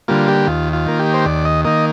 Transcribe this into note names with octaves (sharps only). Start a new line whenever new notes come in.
D3 G3 A#3 F4
G4
D#2 F4
F4
D#3 A#3
G4
C5
D#2 D5
D#5
D#3 A#3 D#5